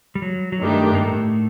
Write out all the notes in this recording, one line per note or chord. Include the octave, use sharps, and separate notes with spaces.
G3
F#3
F#3
G2 D#3 G3 A3 D4 G4
A#3
A2 A3